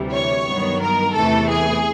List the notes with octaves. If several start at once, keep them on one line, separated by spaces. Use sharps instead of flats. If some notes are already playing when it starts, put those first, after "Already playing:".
Already playing: D2 C3 E3 G3
C#5
G2 D#3 F#3 B3
A#4
E2 C3 E3 A3 A4
G#4